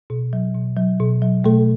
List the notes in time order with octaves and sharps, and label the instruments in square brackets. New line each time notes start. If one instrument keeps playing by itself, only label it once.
[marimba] B2
F#3
B2
F#3
B2
F#3
B2 A3 A4